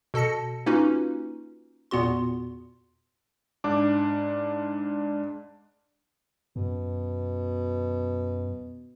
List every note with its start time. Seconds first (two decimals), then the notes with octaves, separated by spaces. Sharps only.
0.14 B2 A4 A5 A#6 C#7
0.66 A#3 C#4 D#4 F4 F#4 B4
1.91 E2 A#2 B3 F#4 C6
3.64 G#2 D4 D6
6.56 F#2 B2